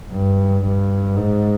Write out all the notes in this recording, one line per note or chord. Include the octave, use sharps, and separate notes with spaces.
G2
G2
G#2